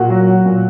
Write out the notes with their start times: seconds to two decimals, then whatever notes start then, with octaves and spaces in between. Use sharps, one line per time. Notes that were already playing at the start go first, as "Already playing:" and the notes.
Already playing: A#2 F#4
0.10 F#3
0.28 F#3
0.45 A#2